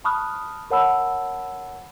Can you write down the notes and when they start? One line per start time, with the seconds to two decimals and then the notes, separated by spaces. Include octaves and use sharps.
0.04 A5 B5 C#6 D#6 F6 F#6
0.70 A#4 C#5 F#5 A5 B5 E6